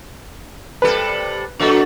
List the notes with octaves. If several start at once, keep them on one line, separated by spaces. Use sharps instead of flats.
C3 G3 A4 B4
A#2 F#3 A3 D4 F#4 A4